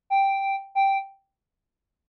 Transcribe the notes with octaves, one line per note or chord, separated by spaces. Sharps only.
G5
G5